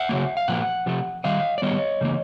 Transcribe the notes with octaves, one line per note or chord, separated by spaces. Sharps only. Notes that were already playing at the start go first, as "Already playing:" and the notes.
Already playing: E5 F#5
C#3 F#3 A#3
F5
A#2 F3 A#3 F#5
C3 F3 A3
D#3 G3 D#5 F5
D5
D#3 G3 B3 C#5 D#5
C#3 E3 G3 A#3